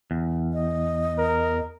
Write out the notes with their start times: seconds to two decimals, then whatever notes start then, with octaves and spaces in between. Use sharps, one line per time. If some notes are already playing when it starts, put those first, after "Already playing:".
0.11 E2
0.53 D#5
1.18 A#4